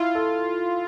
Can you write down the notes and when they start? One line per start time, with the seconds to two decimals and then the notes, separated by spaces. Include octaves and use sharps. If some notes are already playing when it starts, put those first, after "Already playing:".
Already playing: E4 F4
0.15 A4